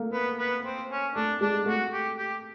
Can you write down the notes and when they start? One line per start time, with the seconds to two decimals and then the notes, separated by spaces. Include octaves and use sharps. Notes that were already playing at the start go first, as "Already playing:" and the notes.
Already playing: A3 A#3
0.13 B3
0.39 B3
0.64 C4
0.89 C#4
1.15 A3 D4
1.41 G#3 D4
1.66 A3 F#4
1.92 G4
2.18 G4